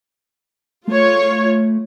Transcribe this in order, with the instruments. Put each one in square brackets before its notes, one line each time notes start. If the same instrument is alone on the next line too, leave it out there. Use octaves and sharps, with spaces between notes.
[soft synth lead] A3 [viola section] F4 C#5